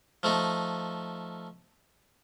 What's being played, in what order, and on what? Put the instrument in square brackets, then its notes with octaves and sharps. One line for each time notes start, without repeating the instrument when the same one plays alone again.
[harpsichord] F3 A3 D#4